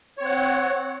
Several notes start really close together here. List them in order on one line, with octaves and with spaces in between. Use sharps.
C#5 C4 F#5